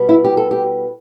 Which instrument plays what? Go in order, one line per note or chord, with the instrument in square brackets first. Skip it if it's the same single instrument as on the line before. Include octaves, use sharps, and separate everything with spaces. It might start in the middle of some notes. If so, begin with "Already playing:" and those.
Already playing: [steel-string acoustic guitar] B2 G3 B3
E4
G4
A4
G4